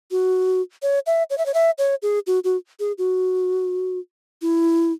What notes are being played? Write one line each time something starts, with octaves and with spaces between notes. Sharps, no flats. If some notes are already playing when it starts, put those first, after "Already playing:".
F#4
C#5
E5
C#5
E5
C#5
E5
C#5
G#4
F#4
F#4
G#4
F#4
E4